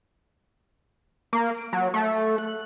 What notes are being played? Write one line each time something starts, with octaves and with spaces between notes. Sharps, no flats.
A#3
D7
F#3
A3
F#6